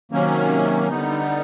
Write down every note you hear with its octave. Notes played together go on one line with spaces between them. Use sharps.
C3 D#3 F#3 A#3 C#4
D3 G3 B3 D#4